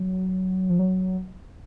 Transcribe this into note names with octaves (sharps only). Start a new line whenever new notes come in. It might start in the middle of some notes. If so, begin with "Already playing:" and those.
Already playing: F#3
F3
F#3